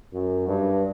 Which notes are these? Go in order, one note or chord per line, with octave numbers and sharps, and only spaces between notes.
F#2
G2